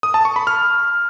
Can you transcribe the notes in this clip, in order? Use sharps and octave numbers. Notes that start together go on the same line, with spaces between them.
D#6
A5
C#6
B5
F6